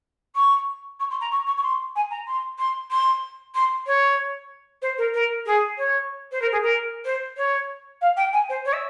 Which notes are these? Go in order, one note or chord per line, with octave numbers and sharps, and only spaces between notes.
C#6
C#6
C6
A#5
C#6
C#6
C#6
C6
G#5
A#5
C6
C6
C6
C6
C#5
C5
A#4
A#4
G#4
C#5
C5
A#4
G#4
A#4
C5
C#5
F5
G5
G#5
C5
C#5
E5